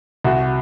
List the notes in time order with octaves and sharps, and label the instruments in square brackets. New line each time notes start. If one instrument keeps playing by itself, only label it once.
[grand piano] C2 F#4